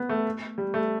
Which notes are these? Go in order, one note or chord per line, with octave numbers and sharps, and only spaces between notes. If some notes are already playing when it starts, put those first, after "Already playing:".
Already playing: B3
A3
G3
A3